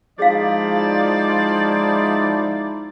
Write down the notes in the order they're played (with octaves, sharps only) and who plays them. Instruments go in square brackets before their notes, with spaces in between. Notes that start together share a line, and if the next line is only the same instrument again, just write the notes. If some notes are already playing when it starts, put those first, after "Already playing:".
[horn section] F3 D5 [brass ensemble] G#3 D#4 E4 [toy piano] G#4 F5